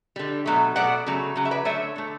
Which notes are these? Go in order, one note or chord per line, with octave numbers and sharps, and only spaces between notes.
D3 G3
B2 F#3 A3
B2 F#3 A3 D5 F#5
C#3 F#3 A3
C#3 F#3
E5
B4 D5
D3 A3 C#5 E5
D3 A3